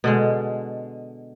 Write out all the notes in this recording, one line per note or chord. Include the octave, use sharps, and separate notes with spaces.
B2 D3 G#3